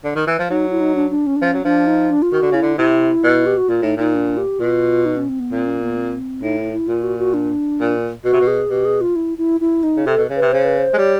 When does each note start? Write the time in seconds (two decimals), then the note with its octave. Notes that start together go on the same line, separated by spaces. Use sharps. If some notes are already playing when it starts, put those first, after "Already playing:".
0.04 D3
0.15 D#3
0.27 E3
0.39 F3
0.50 F#3 D#4
0.71 E4
0.80 D#4
0.95 D4
1.11 D4
1.27 C#4
1.36 D4
1.41 F3 C#4
1.54 F#3
1.64 F3 D4
1.87 D#4
2.10 D4
2.22 F4
2.32 D#3 F#4
2.42 D3
2.52 C#3 E4
2.62 D3
2.78 C3 E4
3.24 B2
3.46 G4
3.57 F#4
3.69 A#2 F4
3.82 A2 D#4
3.96 A#2 D#4
4.15 D4
4.37 G4
4.60 B2 F4
5.06 D#4
5.17 C#4
5.29 C4
5.40 B3
5.51 A#2 C4
5.67 C#4
5.81 B3
5.96 C4
6.42 A2 D#4
6.58 E4
6.72 E4
6.88 A#2 F4
7.03 F#4
7.19 F#4
7.34 D4
7.79 A#2
8.24 B2 F#4
8.33 C3
8.40 B2
8.47 G#4
8.70 B2 G4
8.85 G#4
9.01 F4
9.16 E4
9.38 E4
9.61 E4
9.83 D#4
9.97 C#3
10.06 C3 A4
10.18 B2
10.30 C#3
10.36 C3 B4
10.52 C#3 C5
10.65 B4
10.79 C5
10.94 G#3
10.98 G3 C#5